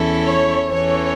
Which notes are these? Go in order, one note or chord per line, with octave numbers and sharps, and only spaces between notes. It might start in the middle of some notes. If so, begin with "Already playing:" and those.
Already playing: E2 E3 C#4 E4 A4
C#5
E2 E3 C#4 A4 C#5